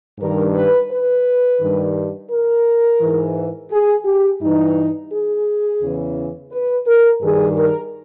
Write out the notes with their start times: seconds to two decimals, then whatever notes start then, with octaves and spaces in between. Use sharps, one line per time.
0.19 G2 D#3 A#4
0.55 B4
0.90 B4
1.60 G2 D#3
2.29 A#4
3.01 G#2 E3
3.71 G#4
4.05 G4
4.41 G2 E3 D#4
5.11 G#4
5.81 E2 C#3 E3
6.52 B4
6.87 A#4
7.21 G2 D#3 G#4
7.56 A#4